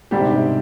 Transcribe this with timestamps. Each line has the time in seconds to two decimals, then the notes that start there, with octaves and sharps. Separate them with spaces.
0.11 G#2 D3 G3 D4 G4
0.19 C3
0.26 B2
0.33 C3